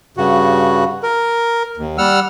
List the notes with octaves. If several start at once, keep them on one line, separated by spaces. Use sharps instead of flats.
G2 C#3 F#4
A#4
D#2
G3 F#5 E6 F6